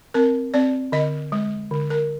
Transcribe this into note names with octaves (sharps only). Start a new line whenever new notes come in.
C4 A#4
C4 D5
D3 D#5
G#3
D3
A#4